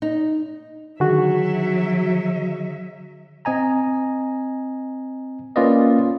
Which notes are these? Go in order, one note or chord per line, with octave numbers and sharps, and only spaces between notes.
D#4
D3 D#3 F#3 F#4 G#4 E5
C4 D#5 G#5 A#5
A#3 C#4 F4 B4 D5 D#5